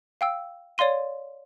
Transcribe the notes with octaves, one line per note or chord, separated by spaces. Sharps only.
F5 G5 E6
C#5 D5 F5 C6 D#7